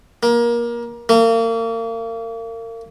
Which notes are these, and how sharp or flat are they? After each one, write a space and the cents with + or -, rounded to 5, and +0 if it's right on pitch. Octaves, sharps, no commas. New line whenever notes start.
A#3 +25
A#3 -35